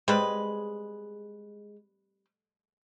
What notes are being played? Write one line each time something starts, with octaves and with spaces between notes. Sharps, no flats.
G3 G#3 C4 B4